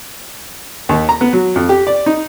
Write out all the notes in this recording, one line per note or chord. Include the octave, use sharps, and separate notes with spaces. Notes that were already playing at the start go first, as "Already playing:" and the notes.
D#2
A#5
B3
F#3
F2
G4
D5
D#4